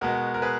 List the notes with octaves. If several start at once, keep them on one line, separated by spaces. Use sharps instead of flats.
B2 G#3 B3 F#4 A#4
A#4
G#4 B4